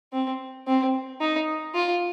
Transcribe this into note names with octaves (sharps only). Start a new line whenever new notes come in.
C4
C4
D#4
F4